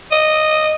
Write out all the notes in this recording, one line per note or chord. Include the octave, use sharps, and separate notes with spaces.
D#5